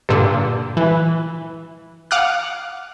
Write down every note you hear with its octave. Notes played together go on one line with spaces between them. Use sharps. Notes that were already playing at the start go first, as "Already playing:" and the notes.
G2 A#2 D3
E3
F5 F#5 D6 D#6 F6 F#6